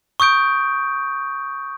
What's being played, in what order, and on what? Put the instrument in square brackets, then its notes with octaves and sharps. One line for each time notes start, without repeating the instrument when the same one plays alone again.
[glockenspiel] C#6 D#6 G6 D7